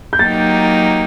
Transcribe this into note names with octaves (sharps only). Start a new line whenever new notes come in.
G6
F#3 A#3 D#4 G4 A6